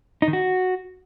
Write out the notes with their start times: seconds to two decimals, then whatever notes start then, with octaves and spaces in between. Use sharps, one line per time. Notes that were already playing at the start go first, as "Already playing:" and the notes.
0.22 D#4
0.28 D#3
0.33 F#4